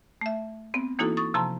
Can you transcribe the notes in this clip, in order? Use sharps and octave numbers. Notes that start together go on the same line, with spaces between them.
A3 E5
B3 C4
E3 A#3 D#4 E4 F#4 A4
C#6 D#6 A6
C3 F3 A5 A#5 C6